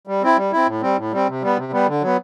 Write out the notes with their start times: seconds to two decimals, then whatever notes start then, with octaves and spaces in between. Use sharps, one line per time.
0.07 G3
0.22 C4 E4
0.37 G3
0.52 C4 E4
0.67 A2
0.82 G3 C4
0.97 A2
1.12 G3 C4
1.28 C3
1.42 G3 B3
1.57 C3
1.72 G3 B3
1.87 D3
2.02 F#3 B3